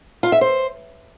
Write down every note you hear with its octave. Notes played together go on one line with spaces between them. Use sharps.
F4
E5
C5